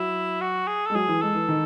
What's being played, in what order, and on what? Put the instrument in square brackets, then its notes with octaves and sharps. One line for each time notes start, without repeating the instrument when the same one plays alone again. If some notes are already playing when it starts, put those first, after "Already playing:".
Already playing: [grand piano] F#3 [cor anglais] E4
[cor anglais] F#4
G#4
[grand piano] G#3 [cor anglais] A4
[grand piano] F#3 [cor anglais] G#4
[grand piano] E3
[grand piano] G#3 [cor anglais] A4
[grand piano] E3
D#3